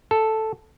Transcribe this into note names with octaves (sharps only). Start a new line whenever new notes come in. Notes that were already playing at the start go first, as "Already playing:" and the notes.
A4